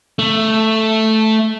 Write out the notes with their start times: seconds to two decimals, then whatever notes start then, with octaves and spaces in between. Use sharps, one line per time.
0.19 A3